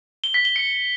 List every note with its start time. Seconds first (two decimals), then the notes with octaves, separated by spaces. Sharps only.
0.24 G7
0.34 B6
0.45 G7
0.56 C#7